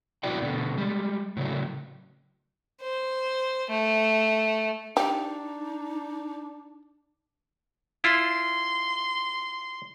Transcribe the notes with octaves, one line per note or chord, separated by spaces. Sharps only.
B2 E4 F#4 D5 G5
B2 D3
G3 G#3
A2 C#3 F#3
C5
A3
D4 D#4 G4
E4 F4 C6